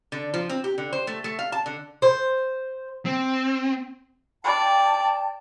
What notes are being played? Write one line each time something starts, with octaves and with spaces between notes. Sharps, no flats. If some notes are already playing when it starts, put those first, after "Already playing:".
D3
F3
C4
G4
D3
C5
A3
A3
F5
A5
D3
C5
C4
D5 G5 A5